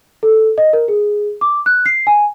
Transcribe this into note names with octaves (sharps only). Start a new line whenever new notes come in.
A4
D#5
A#4
G#4
D6
F#6
C7
G#5